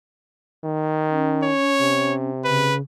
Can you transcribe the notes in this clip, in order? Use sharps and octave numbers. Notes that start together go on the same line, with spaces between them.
D#3
C#4
C#5
C3
C#3 B4